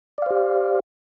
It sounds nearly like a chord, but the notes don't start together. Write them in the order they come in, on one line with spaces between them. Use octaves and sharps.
D5 F5 C5 G4